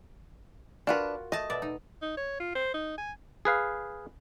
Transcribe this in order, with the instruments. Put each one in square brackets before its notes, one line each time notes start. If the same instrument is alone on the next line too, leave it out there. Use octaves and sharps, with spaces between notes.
[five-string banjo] D4 B4 [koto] F4 F#4 A#4
[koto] A3 A5 [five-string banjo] D#5
[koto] B2 D5 E5
D#4
[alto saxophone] D#4
C#5
F4
C5
D#4
G#5
[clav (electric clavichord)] G#4 B4 F5